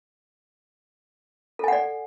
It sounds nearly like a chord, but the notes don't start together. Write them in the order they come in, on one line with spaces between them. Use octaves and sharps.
A4 G#5 F#5 D5